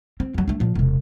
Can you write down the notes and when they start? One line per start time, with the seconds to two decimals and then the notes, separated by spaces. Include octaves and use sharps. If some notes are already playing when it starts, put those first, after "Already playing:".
0.20 C4
0.34 F2 F#3
0.48 A3 D4
0.60 A#2 F3
0.75 E1 C3